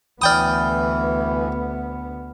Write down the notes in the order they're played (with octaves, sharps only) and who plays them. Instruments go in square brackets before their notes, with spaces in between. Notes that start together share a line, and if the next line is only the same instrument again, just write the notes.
[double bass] D2 B3 [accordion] E3 [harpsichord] D5 G5 D#6 [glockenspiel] B5 F6